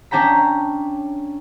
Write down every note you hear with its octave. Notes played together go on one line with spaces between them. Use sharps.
C#4 D4 G5 A#5 B6